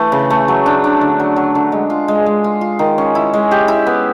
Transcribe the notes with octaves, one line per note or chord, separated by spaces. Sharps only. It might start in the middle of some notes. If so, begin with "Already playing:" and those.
Already playing: E3 A3
C#3
A3
F#3
D4
D4
D3
F#3
F#3
D3
G#3
F4
G#3
G#3
F4
F4
D#3
C#4
E4
G#3
G4
E4
B3